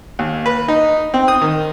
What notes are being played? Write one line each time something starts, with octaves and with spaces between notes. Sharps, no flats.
D#2
B4
D#4
C4
D#6
D#3